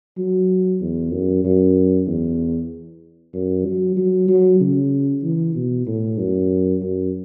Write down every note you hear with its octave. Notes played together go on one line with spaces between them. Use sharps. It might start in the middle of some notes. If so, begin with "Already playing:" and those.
F#3
E2
F#2
F#2
E2
F#2
F#3
F#3
F#3
C#3
E3
B2
A2
F#2
F#2